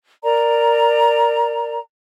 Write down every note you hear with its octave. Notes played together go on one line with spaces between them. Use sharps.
A#4 D5 A#5